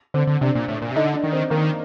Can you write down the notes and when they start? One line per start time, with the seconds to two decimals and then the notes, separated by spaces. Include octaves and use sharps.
0.14 D3 C4
0.27 D3
0.41 C3 D4
0.55 A#2
0.68 A2
0.82 A#2
0.91 C3
0.96 D3 D#4
1.14 D4
1.24 D#3
1.33 C4
1.50 D#3 A#3